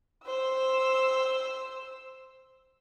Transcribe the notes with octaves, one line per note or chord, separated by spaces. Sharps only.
C5 E6